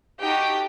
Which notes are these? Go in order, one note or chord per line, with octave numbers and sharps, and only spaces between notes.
D#4 F#4 G4 A4 G5